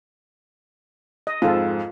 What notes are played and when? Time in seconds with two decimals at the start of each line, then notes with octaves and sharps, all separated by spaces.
1.27 D#5
1.42 F2 G#2 F4 A4